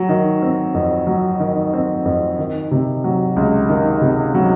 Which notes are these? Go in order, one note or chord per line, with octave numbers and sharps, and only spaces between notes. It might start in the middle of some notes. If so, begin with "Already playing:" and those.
Already playing: F#3
D#3
C4
F2
F#3
D#3
C4
F2
D#3
C3
F#3
C#2
D#3
C3
F#3